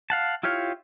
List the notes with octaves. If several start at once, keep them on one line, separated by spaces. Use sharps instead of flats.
F5 F#5 A5
E4 F4 G4 C#5 F5